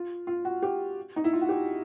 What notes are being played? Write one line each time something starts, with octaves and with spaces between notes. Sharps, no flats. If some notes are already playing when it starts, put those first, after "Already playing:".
Already playing: F4
F4
F#4
G4
D#4
E4
F4
F#4
G4